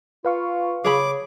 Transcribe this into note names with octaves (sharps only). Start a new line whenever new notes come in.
F4 B4 F5 C#6
C#3 G#4 C#5 B5 D6